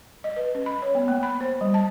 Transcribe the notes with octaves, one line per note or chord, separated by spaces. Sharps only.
D#5
B4
C#4
B5
C#5
B3
A#3
B5
C5
G3
A5